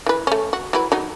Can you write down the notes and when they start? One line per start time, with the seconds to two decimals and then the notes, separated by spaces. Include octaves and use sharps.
0.06 E3 B4
0.27 A3 C#4
0.53 F#4
0.73 F#3 E4 B4
0.92 F#3 D#4